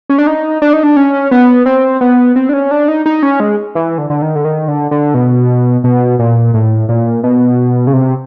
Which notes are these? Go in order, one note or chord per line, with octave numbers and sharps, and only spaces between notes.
C#4
D4
D#4
D4
D#4
D4
C#4
B3
C4
B3
C4
D4
C#4
D4
D#4
D#4
C#4
G#3
E3
D3
D3
D#3
D3
D#3
D3
D3
B2
B2
A#2
A2
A#2
B2
C#3
C3